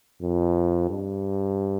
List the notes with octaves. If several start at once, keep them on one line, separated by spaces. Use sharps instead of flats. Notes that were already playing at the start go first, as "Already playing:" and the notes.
F2
G2